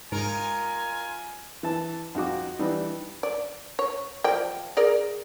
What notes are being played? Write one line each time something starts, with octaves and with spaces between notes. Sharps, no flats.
G#2 D#4 F4 A#4 G#5
E3 A5
F2 D#4 F#4 D6
E3 G3 D4 D#4
D5
C#5
F3 D5 G5
G#4 A#4 D5